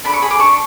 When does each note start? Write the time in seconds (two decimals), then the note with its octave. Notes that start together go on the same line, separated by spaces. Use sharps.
0.04 D4 B5
0.13 C#6
0.22 G#4 B5
0.31 D6
0.39 D4 C#6